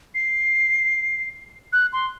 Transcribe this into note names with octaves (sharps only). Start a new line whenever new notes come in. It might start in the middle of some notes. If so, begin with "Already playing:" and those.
C7
F#6
C6